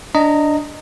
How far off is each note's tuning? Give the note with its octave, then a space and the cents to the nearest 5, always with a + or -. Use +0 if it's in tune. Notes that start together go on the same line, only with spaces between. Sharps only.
D4 +0 D#5 +0 A#5 -20